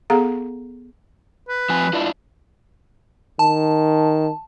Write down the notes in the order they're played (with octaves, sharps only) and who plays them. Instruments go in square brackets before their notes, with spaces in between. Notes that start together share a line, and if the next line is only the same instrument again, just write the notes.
[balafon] B3 G#4 A4 F5 A#5
[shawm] B4
[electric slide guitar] F3 C4 G#5
D4 E4 F4
[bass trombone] D#3 [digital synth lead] A5